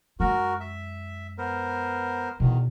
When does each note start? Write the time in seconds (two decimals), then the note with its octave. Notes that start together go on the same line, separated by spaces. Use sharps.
0.20 F#2 G#3 F#4 A#4
0.60 E5
1.38 B3 A#4 C5
2.40 E2 B2 D#3